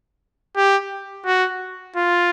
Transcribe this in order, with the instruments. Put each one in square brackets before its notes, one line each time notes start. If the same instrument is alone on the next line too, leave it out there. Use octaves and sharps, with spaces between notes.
[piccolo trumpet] G4
F#4
F4